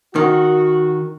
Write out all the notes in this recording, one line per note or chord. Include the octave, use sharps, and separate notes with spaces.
D#3 F#4